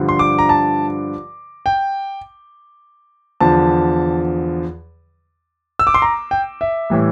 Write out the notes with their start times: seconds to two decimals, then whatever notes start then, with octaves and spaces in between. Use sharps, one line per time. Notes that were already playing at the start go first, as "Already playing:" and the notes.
Already playing: G2 D3 F3
0.09 C6
0.19 D6
0.39 A#5
0.49 A5
1.66 G5
3.40 E2 D3 F3 A5
5.79 E6
5.87 D6
5.94 C6
6.02 A#5
6.31 G5
6.61 E5
6.90 A2 E3 G3